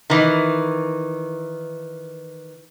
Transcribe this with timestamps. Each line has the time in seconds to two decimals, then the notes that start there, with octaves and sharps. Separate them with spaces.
0.10 D#3 E3